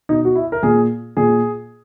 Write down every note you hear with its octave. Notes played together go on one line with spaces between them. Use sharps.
B2 D#4
F#4
E4
A#4
A#2 G#4
A#2 G#4